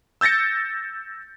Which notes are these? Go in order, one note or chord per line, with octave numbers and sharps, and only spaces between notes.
E6 G6 A6 A#6 C#7